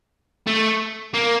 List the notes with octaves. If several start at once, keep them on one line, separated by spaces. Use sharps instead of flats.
A3
A#3